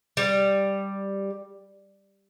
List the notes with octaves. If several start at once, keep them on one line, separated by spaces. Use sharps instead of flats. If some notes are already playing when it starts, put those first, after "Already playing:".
G3